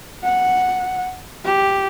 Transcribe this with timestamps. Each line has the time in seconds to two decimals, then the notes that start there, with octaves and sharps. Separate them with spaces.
0.24 F#5
1.45 G4